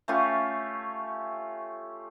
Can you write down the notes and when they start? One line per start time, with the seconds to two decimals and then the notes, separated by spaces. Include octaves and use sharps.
0.08 A3 C#4 F4 G4